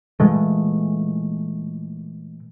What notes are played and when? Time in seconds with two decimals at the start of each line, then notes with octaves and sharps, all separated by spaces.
0.20 A#2 E3 G#3 A3